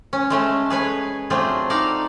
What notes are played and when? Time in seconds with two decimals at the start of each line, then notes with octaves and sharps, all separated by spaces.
0.13 C#4
0.30 G#3 A3 C#4
0.70 G#4 B4 C#5 G#5
1.30 F#3 A3 C4 D4 F4 G#4
1.70 D#4 A4 D5 F5 A#5